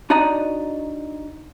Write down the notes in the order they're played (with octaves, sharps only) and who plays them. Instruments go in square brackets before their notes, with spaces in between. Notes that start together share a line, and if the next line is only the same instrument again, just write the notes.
[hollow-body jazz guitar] D4 D#4 F#4 D5 D#5 A#5